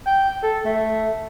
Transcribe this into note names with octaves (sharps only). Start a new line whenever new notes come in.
G5
A4
A3